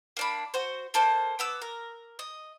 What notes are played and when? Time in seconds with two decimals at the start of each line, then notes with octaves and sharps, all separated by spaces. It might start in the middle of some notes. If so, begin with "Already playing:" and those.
0.17 A#3 D4 B5
0.54 F#4 C5
0.94 A#3 A4 C5
1.39 B3 D6 E6
1.62 A#4
2.19 D#5